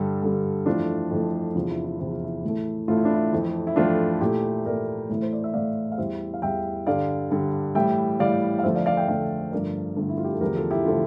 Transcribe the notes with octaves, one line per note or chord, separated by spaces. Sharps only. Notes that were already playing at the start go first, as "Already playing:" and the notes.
Already playing: G2 D3 G3 A4
G2 D3 G3
F2 E3 A3 D4 F4
F2 E3 A3
E2 C3 F3 D4 F4
E4
E4
E2 C3 F3 E4
F4
E4
A2 E3 A3
A2 E3 A3 F4
E4
D4
E4
F2 E3 A3
E4
F2 E3 A3 D4 F4
A#2 A3 E4 G4
A#2 A3 A#4 D5
A2 E3 A3
C5
D5
E5
A2 E3 A3 D5 F5
F5
E2 E3 G3 C5 E5
F5
E2 E3 G3 E5 G5
G2 D3 G3 D5 F5
G2 D3 G3
A2 E3 G3 E5 G5
A2 E3 G3 D5 F5
F5
F2 D3 F3 A3 C5 E5
D5 F5
D5 F5
E5 G5
F2 D3 F3 A3 D5 F5
G2 D3 F3 A3 A#4 D5
G2 D3 F3 A3
E4
F4
G4
A4
E2 D3 F3 A3 G4 A#4
F4 A4
E4 G4
D3 F3 A3 F4 A4